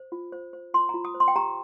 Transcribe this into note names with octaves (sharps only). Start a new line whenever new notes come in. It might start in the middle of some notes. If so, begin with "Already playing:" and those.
Already playing: C5
F4
C5
C5
F4 C6
F4 A#5
D#6
C5
C6
G5
G4 A#5